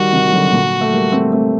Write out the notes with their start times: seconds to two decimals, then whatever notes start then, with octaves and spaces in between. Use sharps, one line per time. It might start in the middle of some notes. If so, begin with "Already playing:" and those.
Already playing: D#3 G3 F#4
0.13 C3 D#3
0.28 G3
0.33 D3 F#3
0.53 A#2 D3
0.81 A3
0.93 G3 A#3
1.12 A3 C4
1.32 A3 C4